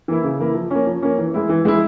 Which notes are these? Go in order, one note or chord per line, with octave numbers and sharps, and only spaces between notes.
E3 A#3 E4
C#3
E3 A#3 E4
F3
A#3 C#4
F3
A#3 C#4
E3
G#3 E4
E3
G#3 E4